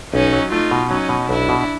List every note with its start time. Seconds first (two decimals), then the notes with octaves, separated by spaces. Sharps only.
0.13 B1 C#4 D#4
0.33 F#3
0.52 A3 D#4 F4
0.71 B2
0.90 F#3 C#4 D#4
1.09 B2
1.29 B1 D4 E4
1.49 B2